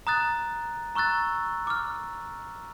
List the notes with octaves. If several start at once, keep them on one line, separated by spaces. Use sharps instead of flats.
A#5 D#6 F#6 A6
A#5 C#6 E6 F#6 A6
D6 F6